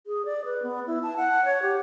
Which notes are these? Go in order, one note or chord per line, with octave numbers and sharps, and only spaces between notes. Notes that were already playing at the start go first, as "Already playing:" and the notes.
G#4
D5
B4
B3
E4
A5
F#5
C#5
G4